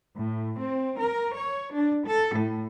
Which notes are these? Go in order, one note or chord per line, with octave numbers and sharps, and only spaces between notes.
A2
C4
A#4
C#5
D4
A4
A2